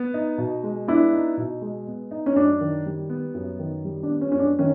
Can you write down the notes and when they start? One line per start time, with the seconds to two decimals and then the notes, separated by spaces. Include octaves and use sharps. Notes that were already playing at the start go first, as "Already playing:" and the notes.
Already playing: B3
0.14 D#4
0.38 B2
0.63 G#3
0.88 B3 D4 E4
1.13 D#4
1.37 B2
1.61 G#3
1.87 B3
2.11 D#4
2.26 C#4
2.36 F#2 D4
2.60 D#3
2.86 G3
3.10 B3
3.34 F#2
3.59 D#3
3.85 G3
4.03 D4
4.09 B3
4.21 C#4
4.32 F#2 C#4
4.39 D4
4.59 D#3 C#4